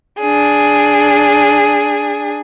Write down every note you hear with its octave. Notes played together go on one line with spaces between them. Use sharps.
D4 G#4